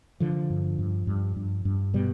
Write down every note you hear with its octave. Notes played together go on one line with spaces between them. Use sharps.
D3 F3
G2
G2
G2
G2
G2
B2 G3